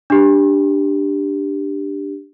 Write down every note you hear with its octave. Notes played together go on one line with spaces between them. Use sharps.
D4 G4